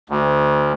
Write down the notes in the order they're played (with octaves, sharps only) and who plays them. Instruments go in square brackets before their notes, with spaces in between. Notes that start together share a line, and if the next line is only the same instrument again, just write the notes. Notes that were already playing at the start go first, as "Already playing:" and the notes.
[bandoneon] D2